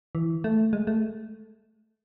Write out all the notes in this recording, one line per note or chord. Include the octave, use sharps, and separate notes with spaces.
E3
A3
G#3
A3